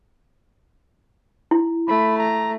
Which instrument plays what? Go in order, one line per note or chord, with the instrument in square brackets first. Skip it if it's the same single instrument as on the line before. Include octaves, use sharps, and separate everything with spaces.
[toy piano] E4
[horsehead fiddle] A3 [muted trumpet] B5
[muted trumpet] A#5